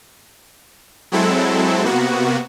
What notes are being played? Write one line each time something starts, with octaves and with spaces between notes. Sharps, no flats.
F#3 G#3 C4 E4 A4
C3 A#3 B3 F#4